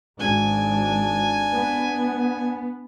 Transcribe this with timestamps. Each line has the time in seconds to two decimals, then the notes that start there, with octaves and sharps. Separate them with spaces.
0.19 G#1 D4 G#5
1.52 B3